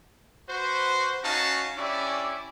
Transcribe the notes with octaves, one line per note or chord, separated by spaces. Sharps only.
F#4 B4 C5
C#4 D#4 F#4 F5 A5
C#4 D4 E4 G4 D5